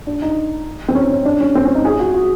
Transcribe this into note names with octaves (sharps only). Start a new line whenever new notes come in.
D4
D#4
C4
C#4
C#4
D4
C#4
C4
C#4
D#4
G#4
F#4
F#4